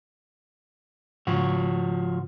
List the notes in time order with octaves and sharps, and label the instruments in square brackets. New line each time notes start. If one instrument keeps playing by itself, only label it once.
[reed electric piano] G#2 C#3 [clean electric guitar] F3 F#4